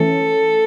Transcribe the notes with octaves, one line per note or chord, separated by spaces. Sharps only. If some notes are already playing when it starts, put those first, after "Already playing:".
Already playing: E3 A3 C#4 A4